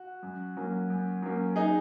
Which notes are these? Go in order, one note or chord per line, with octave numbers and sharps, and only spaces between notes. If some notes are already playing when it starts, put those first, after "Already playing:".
Already playing: F#4
F#2
F#3 A#3 C#4
F#2
F#3 A#3 C#4
D#4 G#4